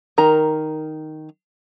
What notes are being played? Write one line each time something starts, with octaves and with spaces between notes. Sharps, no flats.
D#3 A#4 A#5